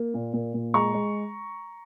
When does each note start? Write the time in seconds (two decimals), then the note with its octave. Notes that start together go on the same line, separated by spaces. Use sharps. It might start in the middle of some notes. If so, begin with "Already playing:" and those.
Already playing: A#3
0.14 A#2
0.34 A#2
0.54 A#2
0.74 G#3 A#5 C#6
0.94 G#3